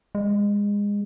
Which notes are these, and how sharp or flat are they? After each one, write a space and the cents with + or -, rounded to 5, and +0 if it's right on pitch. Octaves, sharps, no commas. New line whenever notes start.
G#3 -25